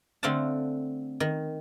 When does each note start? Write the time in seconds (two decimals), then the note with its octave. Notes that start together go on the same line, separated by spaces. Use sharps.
0.23 D3 A3 C4 F5 F#5 A5
1.20 D#3